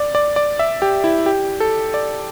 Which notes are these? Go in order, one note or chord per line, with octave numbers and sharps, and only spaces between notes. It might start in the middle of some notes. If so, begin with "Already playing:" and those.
Already playing: D5
D5
D5
E5
G4
E4
G4
A4
D5